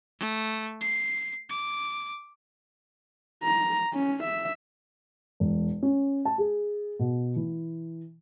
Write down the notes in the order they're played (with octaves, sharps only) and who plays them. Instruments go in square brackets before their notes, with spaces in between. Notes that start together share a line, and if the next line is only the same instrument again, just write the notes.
[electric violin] A3
C7
D6
[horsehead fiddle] A#5
C#4
E5
[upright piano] E1
C#4
A5
G#4
B2
E3